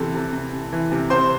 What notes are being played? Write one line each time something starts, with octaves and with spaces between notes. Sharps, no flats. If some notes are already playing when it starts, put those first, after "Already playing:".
Already playing: C3 E3 C4 A4 A5
C3
C3
C3
E3
C3
C3 C5 C6